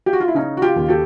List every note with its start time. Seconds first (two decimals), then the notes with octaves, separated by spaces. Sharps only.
0.06 G4
0.13 F#4
0.20 F4
0.28 E4
0.34 C#3 C#4 D#4
0.57 F#4
0.62 F4 G4
0.76 D#2
0.88 G4 A4